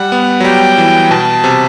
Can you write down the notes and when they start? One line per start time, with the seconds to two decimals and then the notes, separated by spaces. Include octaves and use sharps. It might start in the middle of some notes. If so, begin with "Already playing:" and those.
Already playing: G3 F#5
0.12 B3
0.40 F#3
0.44 G3 G5
0.78 E3
1.11 B2 A5
1.44 C3